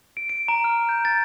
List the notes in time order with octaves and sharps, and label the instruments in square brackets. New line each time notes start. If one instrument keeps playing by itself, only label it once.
[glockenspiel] D7
D7
A#5
F6
G6
A6